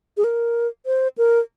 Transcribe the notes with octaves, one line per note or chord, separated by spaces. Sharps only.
G#4
A#4
C5
A#4